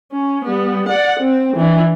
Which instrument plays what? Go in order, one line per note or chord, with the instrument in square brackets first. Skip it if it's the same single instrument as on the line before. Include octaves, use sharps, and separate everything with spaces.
[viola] C#4
G3 B3
D5 F#5
C4
E3 D4